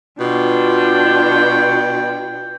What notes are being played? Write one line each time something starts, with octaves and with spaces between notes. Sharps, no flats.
B2 D4 F4 G5